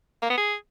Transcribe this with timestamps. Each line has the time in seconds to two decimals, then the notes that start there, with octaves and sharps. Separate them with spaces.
0.22 A#3
0.30 B3
0.38 G#4